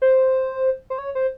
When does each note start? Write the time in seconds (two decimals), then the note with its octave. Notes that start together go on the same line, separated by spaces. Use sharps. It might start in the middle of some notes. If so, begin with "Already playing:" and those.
0.02 C5
0.90 C5
0.98 C#5
1.15 C5